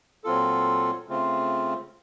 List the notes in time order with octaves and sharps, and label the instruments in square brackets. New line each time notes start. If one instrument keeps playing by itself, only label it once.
[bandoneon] A#2 F#3 C4 F4 A4
C#3 A3 C4 F4